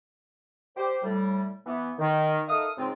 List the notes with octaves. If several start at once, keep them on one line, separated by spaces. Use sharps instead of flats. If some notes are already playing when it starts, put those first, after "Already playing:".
G4 C5
A2 G3
E3 B3
D#3
D#4 A4 A#4 E5 F5 D#6
G#2 C#3 C4 F4